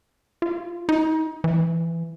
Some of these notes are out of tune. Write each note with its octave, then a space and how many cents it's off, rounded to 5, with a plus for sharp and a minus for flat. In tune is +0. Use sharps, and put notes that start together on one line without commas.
F4 -10
D#4 +35
E3 +15